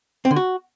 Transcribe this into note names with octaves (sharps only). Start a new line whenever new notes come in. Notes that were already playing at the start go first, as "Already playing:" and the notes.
C4
D3
F#4